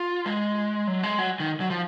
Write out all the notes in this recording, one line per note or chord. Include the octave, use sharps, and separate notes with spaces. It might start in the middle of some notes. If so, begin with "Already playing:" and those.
Already playing: F4
G#3
F#3
G#3
F#3
D#3
F#3
F3